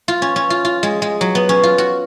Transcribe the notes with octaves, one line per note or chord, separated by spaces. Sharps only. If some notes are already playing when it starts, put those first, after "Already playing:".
F4
C#4
C#4
F4
F4
G#3
G#3
F#3
B3
C#4
F4
F#4